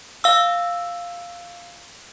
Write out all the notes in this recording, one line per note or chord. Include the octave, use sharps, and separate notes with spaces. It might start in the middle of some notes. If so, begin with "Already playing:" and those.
F5 E6